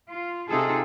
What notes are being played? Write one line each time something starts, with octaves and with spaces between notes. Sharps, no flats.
F4
C3 D#4 F4 G#4 A4